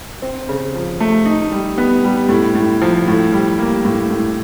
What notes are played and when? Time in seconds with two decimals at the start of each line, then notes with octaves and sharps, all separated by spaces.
0.22 C4
0.49 C#3
0.75 F3
1.00 A3
1.25 D#4
1.52 G3
1.78 B3
2.04 G3
2.29 A2
2.55 A2
2.82 F3
3.08 A2
3.32 G3
3.59 A#3
3.85 A2
4.11 A2